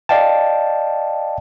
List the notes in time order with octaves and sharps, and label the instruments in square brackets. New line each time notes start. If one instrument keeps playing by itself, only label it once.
[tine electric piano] D5 D#5 F5 G5 A5